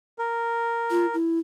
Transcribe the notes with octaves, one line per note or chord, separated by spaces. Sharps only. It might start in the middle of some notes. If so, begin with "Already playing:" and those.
A#4
F4
E4